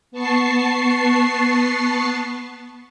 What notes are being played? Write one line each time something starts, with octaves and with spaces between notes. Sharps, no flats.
B3 A5 C#6 C7